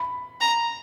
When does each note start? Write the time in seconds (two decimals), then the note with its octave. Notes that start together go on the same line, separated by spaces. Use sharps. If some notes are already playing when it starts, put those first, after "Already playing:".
Already playing: B5
0.41 A#5